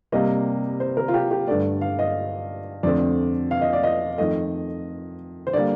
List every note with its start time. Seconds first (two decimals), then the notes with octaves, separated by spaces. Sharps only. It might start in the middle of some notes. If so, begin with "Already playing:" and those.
0.12 C3 G3 A#3 D#5
0.80 C5
0.97 A#4
1.08 F4
1.14 G4
1.31 G4
1.47 G2 D3 A3 D5
1.81 F5
1.99 D#5
2.83 F2 D3 A3 C4 D5
3.51 F5
3.61 D#5
3.73 D5
3.83 D#5
4.18 F2 D#3 A3 D#5
5.47 C5
5.53 D3 G3 A#3 D5